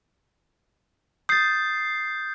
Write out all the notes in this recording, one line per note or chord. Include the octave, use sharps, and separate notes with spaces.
D#6 G6 A6 C7